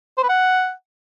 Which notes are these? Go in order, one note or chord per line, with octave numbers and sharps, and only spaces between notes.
C5
B4
F#5